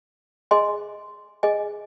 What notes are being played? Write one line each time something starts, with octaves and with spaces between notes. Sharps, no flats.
G#4 D#5 G#5 C6
G#4 D#5 G#5